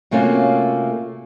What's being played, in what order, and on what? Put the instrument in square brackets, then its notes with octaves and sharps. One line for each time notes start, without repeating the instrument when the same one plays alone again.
[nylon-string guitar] C3 A3 A#3 C#4 F4 F#4